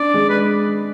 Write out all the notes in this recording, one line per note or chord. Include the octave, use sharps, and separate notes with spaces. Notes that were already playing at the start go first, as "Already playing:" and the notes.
Already playing: D4 D5
G#3
B4